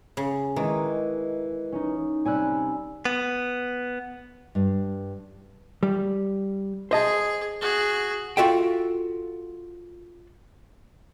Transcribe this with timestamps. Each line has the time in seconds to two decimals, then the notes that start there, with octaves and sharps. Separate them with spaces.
0.17 C#3
0.56 D#3 E3 G#3
1.72 C#4 D#4
2.25 C3 G3 C#4 G#5 E6 F#6
3.05 B3
4.55 G2
5.83 G3
6.91 G#4 C5 D#5 A5
7.61 F#4 G#4
8.37 F4 F#4 A4 E5 F5 G5